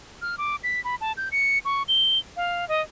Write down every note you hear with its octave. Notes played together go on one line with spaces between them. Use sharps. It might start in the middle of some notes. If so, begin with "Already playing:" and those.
F6
D6
B6
B5
A5
G6
C#7
C#6
G7
F5
D#5